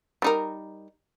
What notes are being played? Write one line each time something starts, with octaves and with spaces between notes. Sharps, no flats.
G3 D#4 A#4